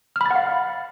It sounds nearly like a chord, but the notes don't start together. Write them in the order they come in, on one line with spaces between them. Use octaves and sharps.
F6 B5 A6 F#5 F5